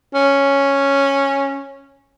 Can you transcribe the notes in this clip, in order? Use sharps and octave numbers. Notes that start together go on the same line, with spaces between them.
C#4